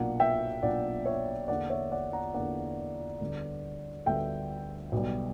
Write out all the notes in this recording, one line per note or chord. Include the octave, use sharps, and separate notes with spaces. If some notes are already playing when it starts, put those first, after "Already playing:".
Already playing: B1 A#2 A#3 D4 F#5
E5 G5
B1 A#2 A#3 D4 D5 F#5
C#5 E5
E2 D3 A#3 D4 D5 F#5
C#5 E5
D5 F#5
F#5 A#5
E2 D3 A#3 D4 D5 F#5
D2 D3 G3 B3 D4
D2 D3 G3 B3 D4 E5 G5
B1 B2 G3